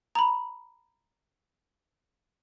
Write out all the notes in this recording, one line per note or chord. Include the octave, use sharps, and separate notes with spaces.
A#5 B5